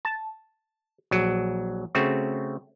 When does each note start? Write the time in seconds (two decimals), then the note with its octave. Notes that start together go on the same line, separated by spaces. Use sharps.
0.05 A5
1.11 A#1 F#3
1.95 C#3 A3 C4 F#4